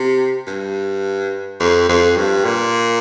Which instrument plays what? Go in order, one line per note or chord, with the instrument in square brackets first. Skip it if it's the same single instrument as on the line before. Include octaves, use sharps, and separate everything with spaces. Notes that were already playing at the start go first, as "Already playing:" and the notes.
Already playing: [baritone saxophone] C3
G2
F2
F2
G2
A#2